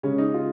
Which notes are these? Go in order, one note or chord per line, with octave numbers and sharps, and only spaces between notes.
C#3 G#3 C#4
D#4
F4